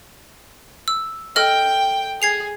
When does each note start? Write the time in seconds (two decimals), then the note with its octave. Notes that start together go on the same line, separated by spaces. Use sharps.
0.88 E6
1.36 A4 D#5 G5 F6
2.22 G#4 G#6 C7 F7